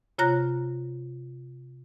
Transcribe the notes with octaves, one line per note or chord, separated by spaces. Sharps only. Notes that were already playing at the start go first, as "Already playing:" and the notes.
C3 F4 C#5 A#5 F#6 A#6